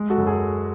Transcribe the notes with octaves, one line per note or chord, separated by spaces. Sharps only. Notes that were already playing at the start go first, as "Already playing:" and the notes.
Already playing: G#3
F#4 A4
F#2
G#4